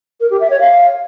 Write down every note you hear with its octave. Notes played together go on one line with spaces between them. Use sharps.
A#4
G4
E5
C#5
F5